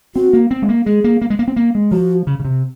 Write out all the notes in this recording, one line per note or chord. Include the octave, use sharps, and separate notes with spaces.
C4 F#4
A#3
C4
G#3
A#3
G#3 G#4
A#3
A#3
G#3
A#3
C4
A#3
G#3
F3 F#4
C#3
C#3
C3